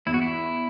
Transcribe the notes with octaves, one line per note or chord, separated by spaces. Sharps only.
E2 E4
F#4
E4